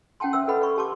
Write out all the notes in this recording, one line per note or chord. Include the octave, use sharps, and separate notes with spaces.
C#4 F#5 G5 A5 C6
C5 E5 E6
A4 B4 D#5 F#5 B5
D5 B5 C#6
G4 A5 C6 D6